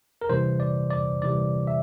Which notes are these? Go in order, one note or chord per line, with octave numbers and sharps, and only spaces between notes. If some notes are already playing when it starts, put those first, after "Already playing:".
A#4
C3 E3 G3 C5
D5
D5
C3 E3 G3 D5
E5